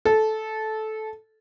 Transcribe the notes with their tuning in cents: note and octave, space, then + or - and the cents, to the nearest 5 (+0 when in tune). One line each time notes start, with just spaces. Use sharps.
A4 -15